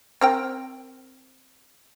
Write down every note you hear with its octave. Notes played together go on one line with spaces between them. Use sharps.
C4 A#4 G5